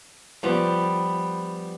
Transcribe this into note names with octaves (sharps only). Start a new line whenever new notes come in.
F3 G3 B3